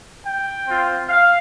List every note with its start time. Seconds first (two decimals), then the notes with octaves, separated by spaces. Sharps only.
0.24 G5
0.66 C4 F4
1.08 F5